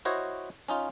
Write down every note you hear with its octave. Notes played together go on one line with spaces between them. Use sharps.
E4 F#4 C5 C#5 D#5
C#4 D#4 F4